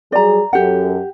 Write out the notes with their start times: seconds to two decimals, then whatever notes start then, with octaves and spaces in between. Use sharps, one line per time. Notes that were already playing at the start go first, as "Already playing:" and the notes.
0.12 F#3 G3 G#4 D5 A#5
0.53 F#2 G4 A4 F#5